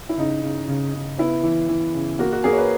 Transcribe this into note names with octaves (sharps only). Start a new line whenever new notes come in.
E4
C#3 D#4
C#3
C#3
C#3
B3 E4
E3
E3
C#3
A#3 F#4
F#4
A#3 G#4
C#5
B4